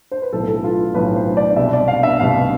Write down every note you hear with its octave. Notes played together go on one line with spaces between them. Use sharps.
C5
B4
B1 A2 E3 B3 A4
A4
F4
B1 A2 E3 B3 B4
C5
D5
C2 B2 B3 E5
D5
F5
E5
C2 B2 B3 F5